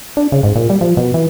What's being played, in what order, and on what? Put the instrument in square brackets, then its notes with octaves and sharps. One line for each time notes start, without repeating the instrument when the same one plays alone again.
[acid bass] D4
C#3
G#2
A#2
G3
F3
B2
E3